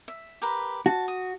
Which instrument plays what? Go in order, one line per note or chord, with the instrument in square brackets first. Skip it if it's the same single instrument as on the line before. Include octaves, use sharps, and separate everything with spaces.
[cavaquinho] E5
G4 A#4 B4
[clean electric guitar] F#4 [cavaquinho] A5
[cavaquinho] D#6